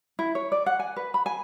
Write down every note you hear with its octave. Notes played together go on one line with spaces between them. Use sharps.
E4
C#5
D5
F#5
G#5
B4
B5
G#5